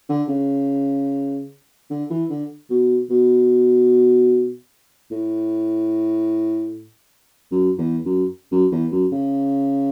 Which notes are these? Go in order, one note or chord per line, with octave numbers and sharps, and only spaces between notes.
D3
C#3
D3
E3
D3
B2
B2
A2
F#2
E2
F#2
F#2
E2
F#2
C#3